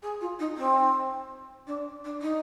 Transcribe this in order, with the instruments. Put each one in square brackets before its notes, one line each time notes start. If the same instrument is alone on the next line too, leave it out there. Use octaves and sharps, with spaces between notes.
[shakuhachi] G#4
F4
D#4
C4
D4
D4
D#4